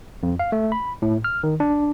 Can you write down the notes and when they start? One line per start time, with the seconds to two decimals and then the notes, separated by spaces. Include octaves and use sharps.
0.23 F2
0.39 F5
0.52 A3
0.72 B5
1.02 A2
1.24 F6
1.43 D#3
1.60 D4